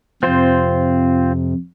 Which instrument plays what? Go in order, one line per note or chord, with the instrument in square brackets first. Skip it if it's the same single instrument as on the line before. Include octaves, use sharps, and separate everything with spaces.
[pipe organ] F2 C3 [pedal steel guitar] C4 F4 C5